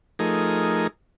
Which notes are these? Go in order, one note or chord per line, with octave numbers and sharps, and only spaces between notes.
F3 A3 D#4 G#4 A#4